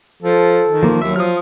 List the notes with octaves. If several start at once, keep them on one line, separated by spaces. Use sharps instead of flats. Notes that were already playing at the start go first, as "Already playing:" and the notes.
F3 A4
D#3
F3 A#3
D#2 F#3 E5
F3 D#6 F6